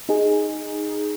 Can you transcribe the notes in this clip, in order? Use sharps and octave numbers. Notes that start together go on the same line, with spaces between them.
D#4 G#4